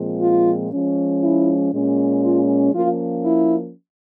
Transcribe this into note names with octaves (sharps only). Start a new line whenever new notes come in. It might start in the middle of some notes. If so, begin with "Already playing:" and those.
Already playing: A#2 F3 G#3 C4
F4
F3 G#3 C#4
E4
A#2 G#3 C#4
F4
F3 A#3 C#4 F4
E4